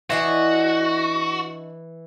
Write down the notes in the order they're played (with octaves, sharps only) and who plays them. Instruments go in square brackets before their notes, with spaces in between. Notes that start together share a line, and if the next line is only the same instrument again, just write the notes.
[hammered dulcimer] E3 [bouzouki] D4 D#5 E5 [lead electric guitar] F#4